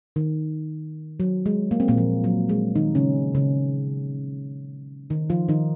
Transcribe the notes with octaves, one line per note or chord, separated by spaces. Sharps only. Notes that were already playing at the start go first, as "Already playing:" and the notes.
D#3
F#3
G#3
A#3
C4
A#2 A#3
F3
F#3
G#3
D#3 D#4
C#3 C#4
C#3 C#4
D#3 D#4
F3 F4
D#3 D#4